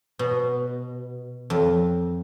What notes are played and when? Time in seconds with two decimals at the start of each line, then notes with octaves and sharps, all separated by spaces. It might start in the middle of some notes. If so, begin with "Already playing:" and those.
0.19 B2
1.50 F2